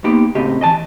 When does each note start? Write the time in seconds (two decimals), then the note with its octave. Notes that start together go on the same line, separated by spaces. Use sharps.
0.04 A#3 B3 D#4 G4
0.35 A2 C#3 C4 F#4 G4 D#5
0.61 E3 A3 D#5 G#5 A5